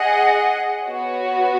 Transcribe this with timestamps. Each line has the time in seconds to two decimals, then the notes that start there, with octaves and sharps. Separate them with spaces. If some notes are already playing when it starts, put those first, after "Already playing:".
Already playing: G#4 D#5 F#5
0.86 B3 F#4 C#5